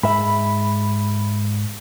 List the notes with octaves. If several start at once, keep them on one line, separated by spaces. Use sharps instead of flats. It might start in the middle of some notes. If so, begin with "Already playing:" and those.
G#2 E5 B5